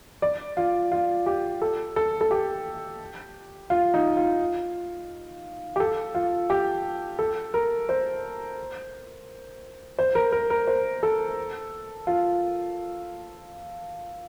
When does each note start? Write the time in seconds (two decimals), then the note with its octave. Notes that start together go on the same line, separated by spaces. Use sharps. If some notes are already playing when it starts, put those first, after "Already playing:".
0.22 D5
0.57 F4
0.92 F4
1.26 G4
1.62 A4
1.96 A4
2.21 A4
2.31 G4
3.70 F4
3.94 D#4
4.17 F4
5.76 G4
5.80 A4
6.15 F4
6.50 G4
7.19 A4
7.54 A#4
7.89 C5
9.99 C5
10.15 A#4
10.32 A#4
10.50 A#4
10.67 C5
11.03 A4
12.07 F4